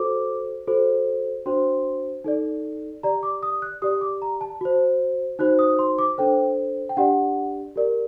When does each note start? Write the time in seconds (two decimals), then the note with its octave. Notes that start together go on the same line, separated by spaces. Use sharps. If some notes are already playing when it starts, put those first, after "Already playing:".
Already playing: F#4 A4 C5 D6
0.67 F#4 A4 C5
1.46 D4 F#4 C5 C6
2.24 D#4 A4 D5
3.03 G4 D5 A#5
3.23 D6
3.43 D#6
3.62 F#6
3.82 G4 D5 D#6
4.01 D6
4.22 A#5
4.41 A5
4.61 F#4 C5
5.39 D#4 F#4 C5 F#6
5.59 D#6
5.79 C6
5.99 D6
6.18 D4 A4 C5 G5
6.89 G5
6.97 D4 G4 D5 F#5
7.76 G4 A#4 D5